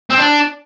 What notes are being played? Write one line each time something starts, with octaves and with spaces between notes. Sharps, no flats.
C4
D4